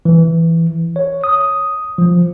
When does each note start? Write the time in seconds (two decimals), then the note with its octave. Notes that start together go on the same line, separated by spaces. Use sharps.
0.05 E3
0.96 C#5
1.24 D#6
1.98 F3